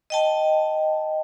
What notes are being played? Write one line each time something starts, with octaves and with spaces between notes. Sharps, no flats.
D#5 G5 A5